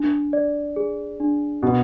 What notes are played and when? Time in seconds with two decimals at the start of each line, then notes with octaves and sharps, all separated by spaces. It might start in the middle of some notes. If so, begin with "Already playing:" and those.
Already playing: D4
0.33 D5
0.76 G#4
1.20 D4
1.63 B2 F#4